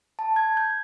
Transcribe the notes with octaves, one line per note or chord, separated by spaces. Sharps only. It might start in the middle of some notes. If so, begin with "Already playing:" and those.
A5
G#6
G6